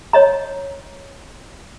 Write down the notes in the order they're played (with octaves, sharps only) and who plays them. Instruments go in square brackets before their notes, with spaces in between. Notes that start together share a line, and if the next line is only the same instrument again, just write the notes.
[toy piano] C#5 D#5 A#5